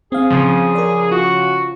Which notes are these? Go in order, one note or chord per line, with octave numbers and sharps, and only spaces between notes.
C4 G#4 F5
C#3 F3
A#4 D5
F4 F#4